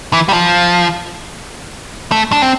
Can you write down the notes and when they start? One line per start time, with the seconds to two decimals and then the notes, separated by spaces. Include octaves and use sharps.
0.13 E3
0.29 G3
0.33 F3
2.12 A3
2.32 D4
2.42 C4